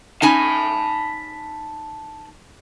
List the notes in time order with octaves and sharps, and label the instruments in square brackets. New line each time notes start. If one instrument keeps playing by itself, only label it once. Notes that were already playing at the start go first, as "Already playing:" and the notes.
[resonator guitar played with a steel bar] C#4 D#4 G#5 [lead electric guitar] A5 B5